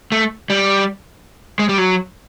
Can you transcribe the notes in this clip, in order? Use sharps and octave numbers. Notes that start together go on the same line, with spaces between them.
A3
G3
G#3
G3
F#3